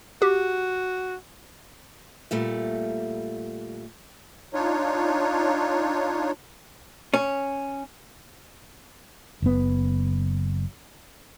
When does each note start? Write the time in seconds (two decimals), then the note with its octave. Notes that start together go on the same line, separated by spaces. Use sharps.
0.22 F#4 G4
2.31 A#2 G3 A3
4.54 D4 D#4 F4 C#5
7.14 C#4
9.42 F#1 B3